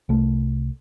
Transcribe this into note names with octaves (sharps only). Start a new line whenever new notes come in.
C2 A3